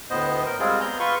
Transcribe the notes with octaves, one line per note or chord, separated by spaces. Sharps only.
D2 A2 B3 C5 D#5
A#4
G3 G#3 C4 F4 G#4
B3 A#5 G6
F4 B4 C6 C#6